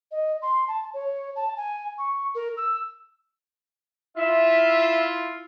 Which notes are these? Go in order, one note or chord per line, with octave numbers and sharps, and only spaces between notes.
D#5
C6
A5
C#5
A5
G#5
C#6
A#4
E6
E4 F4 E5